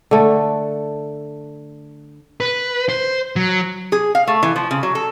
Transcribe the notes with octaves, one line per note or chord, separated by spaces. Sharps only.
D3 A3
B4
C5
F#3
G#4
F5
A3
E3
F3
C#3
F#3
A4